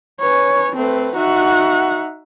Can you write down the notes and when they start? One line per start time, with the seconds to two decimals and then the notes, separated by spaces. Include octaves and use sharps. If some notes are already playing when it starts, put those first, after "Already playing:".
0.21 C#4 B4 C#5
0.76 A3 C4 B4
1.16 D#4 F#4 E5 F#5